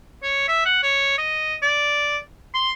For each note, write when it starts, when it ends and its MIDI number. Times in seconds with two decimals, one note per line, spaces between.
0.23 0.44 73
0.48 0.65 76
0.65 0.78 78
0.83 1.16 73
1.18 1.56 75
1.62 2.18 74
2.54 2.71 84